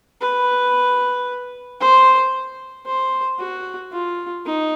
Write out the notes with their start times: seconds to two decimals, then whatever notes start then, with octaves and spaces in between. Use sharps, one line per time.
0.21 B4
1.80 C5
2.86 C5
3.39 F#4
3.92 F4
4.45 D#4